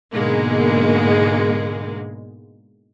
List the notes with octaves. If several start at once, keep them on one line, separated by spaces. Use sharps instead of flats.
G#2 B2 D3 G#3 A#3